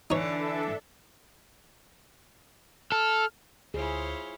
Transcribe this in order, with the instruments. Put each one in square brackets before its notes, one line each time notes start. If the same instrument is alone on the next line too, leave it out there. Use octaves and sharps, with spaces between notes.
[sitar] D3 E3 [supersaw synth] D4 A4 E5 [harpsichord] D#4 C#5
[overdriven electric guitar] A4 [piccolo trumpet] F6
[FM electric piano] D2 [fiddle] E4 F4 [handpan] G#4 [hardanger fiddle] C5 C#5